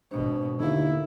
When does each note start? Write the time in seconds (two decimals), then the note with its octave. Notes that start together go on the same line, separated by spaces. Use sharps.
0.11 G#1 B2 D4 C5
0.60 D#2 D3 A#3 E4